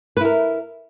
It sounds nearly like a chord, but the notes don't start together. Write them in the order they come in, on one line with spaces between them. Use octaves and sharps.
B4 E4 A#4